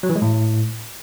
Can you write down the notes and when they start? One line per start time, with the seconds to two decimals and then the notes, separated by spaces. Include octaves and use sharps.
0.03 F#3
0.09 E3
0.16 G#3
0.22 A2